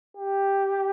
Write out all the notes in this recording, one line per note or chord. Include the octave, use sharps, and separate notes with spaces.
G4